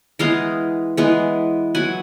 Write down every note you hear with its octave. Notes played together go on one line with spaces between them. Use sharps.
E3 G#3 B3 D#5 F5
E3 G#3 B3
F#3 B3 E4 F#5 G#5